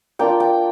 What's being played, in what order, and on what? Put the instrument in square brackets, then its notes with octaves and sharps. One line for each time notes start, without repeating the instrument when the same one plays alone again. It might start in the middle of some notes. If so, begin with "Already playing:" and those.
[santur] A#3 D4 F4 G5
G5